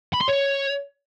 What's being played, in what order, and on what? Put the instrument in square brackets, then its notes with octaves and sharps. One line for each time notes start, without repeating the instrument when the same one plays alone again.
[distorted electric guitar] B5
C6
C#5